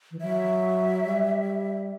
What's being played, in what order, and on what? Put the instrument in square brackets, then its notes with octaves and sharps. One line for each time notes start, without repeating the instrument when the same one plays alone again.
[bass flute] E3
[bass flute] F#3 [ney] E5
[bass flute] G3